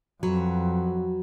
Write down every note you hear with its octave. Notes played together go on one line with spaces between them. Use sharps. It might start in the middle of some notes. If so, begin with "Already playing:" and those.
F2 F#3 F#4 B4